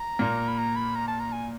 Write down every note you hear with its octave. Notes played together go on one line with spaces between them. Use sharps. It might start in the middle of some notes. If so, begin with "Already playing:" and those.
Already playing: A#5
A#2 A#3
B5
A#5
B5
A#5
A5
A#5
G#5